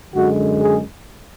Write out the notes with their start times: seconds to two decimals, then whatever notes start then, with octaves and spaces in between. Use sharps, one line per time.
0.14 F#2 D3 G#3 F#4
0.63 G#4